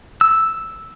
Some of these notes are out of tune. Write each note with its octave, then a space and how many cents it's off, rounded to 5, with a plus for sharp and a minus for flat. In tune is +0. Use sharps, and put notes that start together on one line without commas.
E6 +0